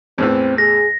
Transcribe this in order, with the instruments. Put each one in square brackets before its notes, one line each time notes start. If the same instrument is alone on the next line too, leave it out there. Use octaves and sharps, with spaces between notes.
[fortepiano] E2 A2 E3 [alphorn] C4
[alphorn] G#4 [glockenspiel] A#6